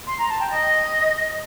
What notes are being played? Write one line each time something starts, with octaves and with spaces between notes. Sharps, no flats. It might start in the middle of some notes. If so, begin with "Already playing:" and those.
C6
A#5
A5
G5
D#5